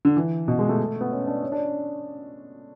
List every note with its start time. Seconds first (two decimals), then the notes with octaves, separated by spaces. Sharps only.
0.05 D3
0.17 E3
0.48 B2
0.59 G#3
0.69 A3
1.01 B3
1.11 C#4
1.27 D4
1.43 C#4
1.52 D4